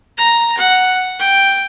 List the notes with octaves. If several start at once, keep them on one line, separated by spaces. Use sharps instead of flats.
A#5
F#5
G5